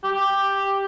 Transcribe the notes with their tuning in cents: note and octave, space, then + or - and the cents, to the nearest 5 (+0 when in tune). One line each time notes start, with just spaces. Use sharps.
G4 +5